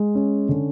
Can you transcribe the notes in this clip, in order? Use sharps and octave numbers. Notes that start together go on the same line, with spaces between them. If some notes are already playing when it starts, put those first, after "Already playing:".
Already playing: G#3
C#4
D3